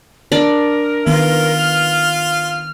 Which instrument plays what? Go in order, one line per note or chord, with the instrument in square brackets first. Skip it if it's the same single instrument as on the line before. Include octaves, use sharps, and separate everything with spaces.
[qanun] D4 D5 [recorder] A#4
[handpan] D#3 B3 [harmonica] F4
[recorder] F6